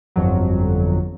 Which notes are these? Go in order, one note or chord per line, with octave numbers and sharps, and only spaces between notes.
G1 F2 F#3